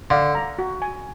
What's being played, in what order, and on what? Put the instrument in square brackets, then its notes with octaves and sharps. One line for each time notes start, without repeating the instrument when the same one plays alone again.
[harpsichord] D3 [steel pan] F5
[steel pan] A#5
F#4
G#5